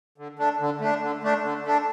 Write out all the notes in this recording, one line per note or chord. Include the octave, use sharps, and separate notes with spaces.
D3
A3 D4
D3
A3 D4
D3
A3 D4
D3
A3 D4